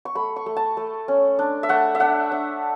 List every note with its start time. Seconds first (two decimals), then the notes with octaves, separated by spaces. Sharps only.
0.05 C#6
0.15 A3 B5
0.36 C#6
0.46 A3
0.57 A5
0.77 A3
1.08 C#4
1.39 D4
1.63 E5
1.69 A3 F#5
1.95 E5
2.00 D4 F#5
2.32 D4